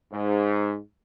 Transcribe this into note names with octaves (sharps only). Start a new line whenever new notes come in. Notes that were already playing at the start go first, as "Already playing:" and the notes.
G#2